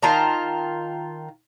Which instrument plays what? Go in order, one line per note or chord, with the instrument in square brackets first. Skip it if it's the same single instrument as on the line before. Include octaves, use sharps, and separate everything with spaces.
[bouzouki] D#3 F4 A5 A#5